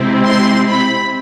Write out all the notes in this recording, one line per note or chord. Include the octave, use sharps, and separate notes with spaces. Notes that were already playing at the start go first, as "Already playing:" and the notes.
Already playing: C3 G#3 C4 E4
C6
B5